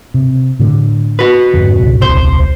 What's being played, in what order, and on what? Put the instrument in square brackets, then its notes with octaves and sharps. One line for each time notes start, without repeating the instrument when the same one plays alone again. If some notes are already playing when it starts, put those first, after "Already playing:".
[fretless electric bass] C3
A2 D3
[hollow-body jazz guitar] F#4 B4
[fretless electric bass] F2 G#2 D3
C#2 G2 B2
[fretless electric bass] D#1 C2 [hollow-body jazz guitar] C5